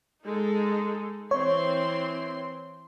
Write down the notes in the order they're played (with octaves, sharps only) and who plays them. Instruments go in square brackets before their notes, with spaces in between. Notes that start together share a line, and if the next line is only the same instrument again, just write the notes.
[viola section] G#3 D#4 A4
[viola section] E3 C4 C6 [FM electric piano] C#5